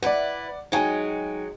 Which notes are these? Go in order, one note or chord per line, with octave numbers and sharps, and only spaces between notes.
E4 B4 D5 F#5
F#3 G#3 D#4 G5 G#5